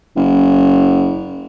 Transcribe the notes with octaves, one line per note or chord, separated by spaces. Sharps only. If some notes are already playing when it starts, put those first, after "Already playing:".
F#1